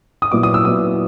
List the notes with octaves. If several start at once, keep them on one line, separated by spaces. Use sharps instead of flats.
D#6
A#2 F#3 B3 E4 D6
D#6
E6
A#2 F#3 B3 E4 D#6